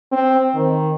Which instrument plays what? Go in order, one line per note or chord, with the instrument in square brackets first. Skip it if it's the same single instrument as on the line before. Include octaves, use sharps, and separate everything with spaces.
[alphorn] C4
D#3